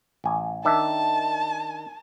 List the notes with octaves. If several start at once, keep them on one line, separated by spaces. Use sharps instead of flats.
A1 G#5
D#3 D4 E5 A5